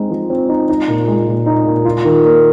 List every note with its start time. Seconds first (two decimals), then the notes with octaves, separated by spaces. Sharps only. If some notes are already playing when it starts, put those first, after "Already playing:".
Already playing: G#3 C4 D#4
0.11 F3
0.30 C4
0.49 D#4
0.69 D#4
0.88 A#2
1.08 G#3
1.27 A#2
1.46 D#4
1.66 A#2
1.85 F4
2.04 D#3
2.24 A#3